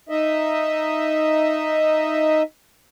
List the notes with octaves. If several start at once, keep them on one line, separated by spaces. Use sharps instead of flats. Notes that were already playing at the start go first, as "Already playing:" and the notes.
D#4 D#5 E5